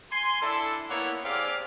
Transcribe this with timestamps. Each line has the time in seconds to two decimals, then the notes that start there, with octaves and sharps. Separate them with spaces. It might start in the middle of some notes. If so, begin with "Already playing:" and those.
0.12 G#5 C6
0.42 D4 E4 A4
0.90 A#3 B3 E4 C#5 F#5
1.24 C4 G4 G#4 D5 F5